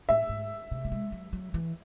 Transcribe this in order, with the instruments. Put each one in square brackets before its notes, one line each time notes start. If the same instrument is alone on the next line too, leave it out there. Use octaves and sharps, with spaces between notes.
[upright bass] A2 [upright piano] E5
[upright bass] G#2
C3
A3
G#3
F#3
F#3
E3